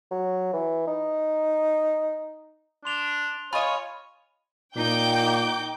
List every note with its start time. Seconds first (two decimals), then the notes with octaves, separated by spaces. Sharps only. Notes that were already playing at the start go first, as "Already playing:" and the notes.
0.11 F#3
0.53 E3
0.87 D#4
2.85 D4 C6 F7 G7
3.53 F4 C#5 D#5 G#5 B5
4.76 A#2 D#4 G5 D6 G6